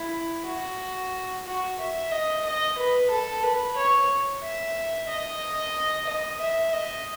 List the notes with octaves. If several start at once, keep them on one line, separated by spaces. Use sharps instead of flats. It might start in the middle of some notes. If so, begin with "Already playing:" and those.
Already playing: E4
F#4
F#4
E5
D#5
D#5
B4
A4
B4
C#5
E5
D#5
D#5
E5
D#5